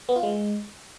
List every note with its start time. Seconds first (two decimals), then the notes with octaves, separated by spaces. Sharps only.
0.09 B3
0.16 F4
0.23 G#3